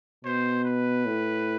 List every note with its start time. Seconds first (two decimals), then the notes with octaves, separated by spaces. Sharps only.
0.25 B2 C5
0.65 B4
1.05 A2